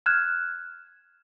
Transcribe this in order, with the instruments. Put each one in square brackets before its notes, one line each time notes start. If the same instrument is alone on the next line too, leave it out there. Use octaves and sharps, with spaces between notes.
[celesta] F6 F#6 G#6 E7